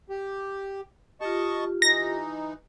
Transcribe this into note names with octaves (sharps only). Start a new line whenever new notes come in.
G4
F4 G4 D#5 A5 C#6
E3 D#4 A#6